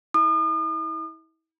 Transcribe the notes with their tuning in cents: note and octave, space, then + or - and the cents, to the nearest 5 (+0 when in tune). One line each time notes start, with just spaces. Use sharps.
E4 -35 D#6 -40